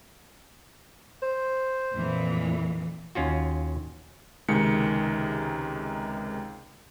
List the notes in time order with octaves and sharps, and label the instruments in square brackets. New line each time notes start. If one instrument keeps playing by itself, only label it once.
[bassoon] C5
[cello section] F2 A#2 E3
[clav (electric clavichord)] D#2 C#4 F4 F#4
[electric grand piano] C#2 C3 D#3 G#3 C#7